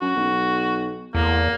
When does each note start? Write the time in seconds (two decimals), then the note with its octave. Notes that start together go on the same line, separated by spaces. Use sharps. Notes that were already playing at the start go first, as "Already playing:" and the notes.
0.01 F#2 F#4
0.16 B1
1.15 E2 A2 A#3